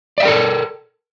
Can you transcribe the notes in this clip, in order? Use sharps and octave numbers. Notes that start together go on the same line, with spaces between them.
A4 A#4 D5 E5 G5